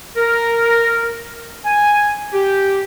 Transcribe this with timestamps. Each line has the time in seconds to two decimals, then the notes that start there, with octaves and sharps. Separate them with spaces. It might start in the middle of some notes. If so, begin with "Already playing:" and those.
0.17 A#4
1.65 G#5
2.33 G4